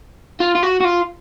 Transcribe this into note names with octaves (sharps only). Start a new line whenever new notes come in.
F4
F4
F#4
F#4
F4